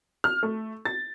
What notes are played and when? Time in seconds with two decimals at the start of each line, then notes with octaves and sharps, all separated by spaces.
0.24 F6
0.43 A3
0.85 A6